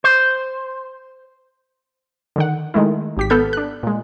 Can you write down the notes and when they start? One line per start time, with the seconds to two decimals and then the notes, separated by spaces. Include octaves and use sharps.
0.04 C5
2.36 D3 D#3 F#5
2.74 D#3 G#3 A3 E4
3.17 G#1 G4 B6
3.30 B3 A4 F6 G6
3.53 D4 F#6
3.83 A#2 G#3